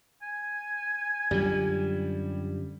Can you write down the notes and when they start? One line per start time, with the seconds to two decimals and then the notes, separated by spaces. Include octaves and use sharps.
0.22 G#5
1.31 F#2 D3 F3 G3